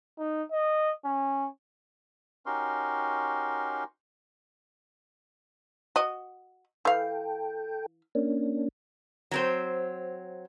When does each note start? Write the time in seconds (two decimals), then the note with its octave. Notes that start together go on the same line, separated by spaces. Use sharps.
0.18 D#4
0.52 D#5
1.05 C#4
2.46 C#4 D#4 F#4 G4 A#4 C6
5.96 F#4 D#5
6.85 E3 A4 F5 G5
8.15 A#3 C#4 D4
9.31 F#3 C4 C5